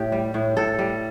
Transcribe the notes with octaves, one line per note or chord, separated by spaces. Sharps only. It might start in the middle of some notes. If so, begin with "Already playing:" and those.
Already playing: A2 A3 G4
G3
A2
A2 A4
G3